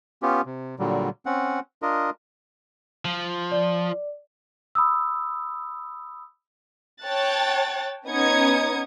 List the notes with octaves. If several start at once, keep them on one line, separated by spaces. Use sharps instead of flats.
B3 C#4 F4 G4
C3
A#2 D3 F#3 G3
C4 C#4 F#5
D4 F4 A#4 D#5
F3
D5
B5 D#6 E6
C#5 G5 A5 F#6 A6
B3 C#4 D#4 D#6 G#6 C#7